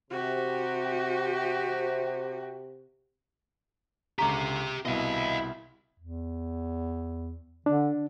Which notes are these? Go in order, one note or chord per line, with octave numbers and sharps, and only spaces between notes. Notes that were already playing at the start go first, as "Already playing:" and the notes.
C3 F#4 G4
C#2 D3 G4 E5 A#5 C#6 D6 B6
C2 B2 E4 D#5 F5
E2
D3 D4